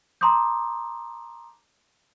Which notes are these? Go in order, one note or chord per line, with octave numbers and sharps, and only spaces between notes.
A5 A#5 C6 D6 D#6 G6